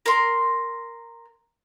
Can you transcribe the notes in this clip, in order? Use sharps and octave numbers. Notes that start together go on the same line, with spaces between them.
A#4 C6